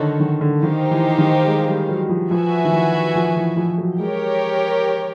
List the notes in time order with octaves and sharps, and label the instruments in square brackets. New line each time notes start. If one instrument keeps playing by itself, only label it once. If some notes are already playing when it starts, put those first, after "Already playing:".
Already playing: [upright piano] D3 D#3 [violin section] D#4 F#4 A4 C#5
[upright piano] D#3
D3
[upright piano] D#3 [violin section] D#4 G4 C5 F5
[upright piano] E3
D#3
G#3
G3
F#3
F3
[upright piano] F3 [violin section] F#4 B4 E5 G#5
[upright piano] D#3
E3
F3
E3
F3
F#3
[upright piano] G#3 [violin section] G4 A#4 C#5